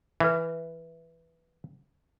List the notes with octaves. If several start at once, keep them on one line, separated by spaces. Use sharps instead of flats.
E3 B4 E5